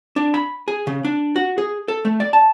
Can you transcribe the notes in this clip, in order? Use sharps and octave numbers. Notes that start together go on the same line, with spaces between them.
D4
B5
G#4
C#3
D4
F#4
G#4
A4
A3
D5
A5